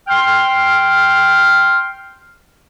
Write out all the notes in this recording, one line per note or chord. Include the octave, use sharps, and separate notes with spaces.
G5 C6 F6